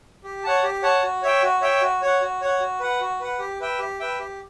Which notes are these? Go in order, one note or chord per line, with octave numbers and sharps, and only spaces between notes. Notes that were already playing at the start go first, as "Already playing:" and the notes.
G4
C#5 F#5 A5
G4
C#5 F#5 A5
F#4
C#5 E5 G5
F#4
C#5 E5 G5
F#4
C#5 F#5
F#4
C#5 F#5
F#4
B4 F#5
F#4
B4 F#5
G4
B4 E5 G5
G4
B4 E5 G5
G4